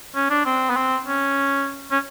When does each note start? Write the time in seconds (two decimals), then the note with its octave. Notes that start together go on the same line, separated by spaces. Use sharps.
0.15 C#4
0.30 D4
0.46 C4
0.70 B3
0.76 C4
1.07 C#4
1.91 C#4